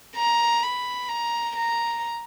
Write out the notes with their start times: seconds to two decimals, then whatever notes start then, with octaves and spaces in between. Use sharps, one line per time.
0.16 A#5
0.63 B5
1.09 A#5
1.56 A#5